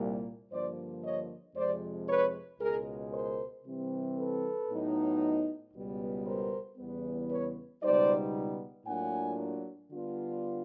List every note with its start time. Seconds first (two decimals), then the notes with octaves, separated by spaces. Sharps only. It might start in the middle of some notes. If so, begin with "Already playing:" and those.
Already playing: C2 A#2 G3 A#3
0.52 G2 D3 F3 A#3 C5 D5
1.04 C#5 D#5
1.56 F2 C3 F3 G#3 C5 D5
2.08 B4 C#5
2.61 C#2 B2 G#3 G#4 A#4
3.13 A#4 C5
3.65 C3 E3 G3 C4
4.17 A4 B4
4.70 A2 F#3 B3 D#4
5.74 C#2 B2 G3 B3
6.26 A#4 C5
6.78 E2 C#3 E3 G3 B3
7.30 B4 C#5
7.82 C#2 B2 G3 B3 D#4 C5 D5
8.87 A2 F#3 A#3 D4 F4 F#5 G#5
9.92 D3 G3 B3 D4 F4